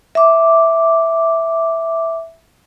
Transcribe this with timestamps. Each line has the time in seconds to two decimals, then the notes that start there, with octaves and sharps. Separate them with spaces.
0.15 E5 D6